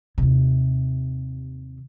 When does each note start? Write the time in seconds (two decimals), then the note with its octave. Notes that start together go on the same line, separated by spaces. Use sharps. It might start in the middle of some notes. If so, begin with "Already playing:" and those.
0.18 D#2 C3